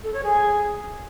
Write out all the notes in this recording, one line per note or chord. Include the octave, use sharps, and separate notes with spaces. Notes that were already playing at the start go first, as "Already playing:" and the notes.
A4
C#5
G#4